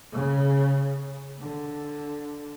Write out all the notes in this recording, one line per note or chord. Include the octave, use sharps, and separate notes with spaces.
C#3
D3